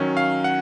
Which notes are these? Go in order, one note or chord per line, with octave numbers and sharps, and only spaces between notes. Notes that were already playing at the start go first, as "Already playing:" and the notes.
Already playing: D#3 F#3 C#4
F5
F#5